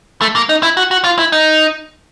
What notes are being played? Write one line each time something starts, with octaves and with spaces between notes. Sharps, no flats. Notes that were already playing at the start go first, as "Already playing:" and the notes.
A3
A#3
D#4
E4
F#4
F#4
F4
E4
D#4